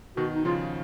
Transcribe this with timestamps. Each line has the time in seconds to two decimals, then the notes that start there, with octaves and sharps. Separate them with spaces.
0.17 B2 D#3 F#4
0.35 D#4
0.45 C#3 F3 F4